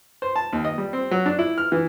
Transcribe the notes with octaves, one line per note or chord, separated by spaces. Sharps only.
C5
A5
D#2
D#5
G3
C4
F#3
D4
E4
F6
E3